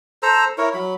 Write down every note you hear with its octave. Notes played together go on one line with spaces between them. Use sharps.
A4 C5 A#5 E6
E4 A#4 C#5
F#3 B5